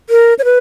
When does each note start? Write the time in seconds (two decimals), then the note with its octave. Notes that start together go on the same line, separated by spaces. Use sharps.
0.10 A#4
0.39 C#5
0.44 B4